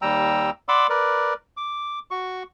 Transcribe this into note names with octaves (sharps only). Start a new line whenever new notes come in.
D#2 G3 G5 A#5 E6
D5 F#5 B5 C6 D6 E6
A#4 B4 D5
D6
F#4 C#6